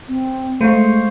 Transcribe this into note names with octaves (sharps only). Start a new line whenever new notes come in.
C4
G#3 A3 C5 F5 C#6